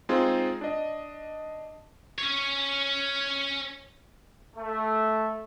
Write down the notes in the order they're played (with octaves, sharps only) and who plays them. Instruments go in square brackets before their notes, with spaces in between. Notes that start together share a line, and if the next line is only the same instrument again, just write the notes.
[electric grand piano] G#3 C4 D#4 F4 G#4
D4 D#5
[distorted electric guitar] C#4 C#5
[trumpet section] A3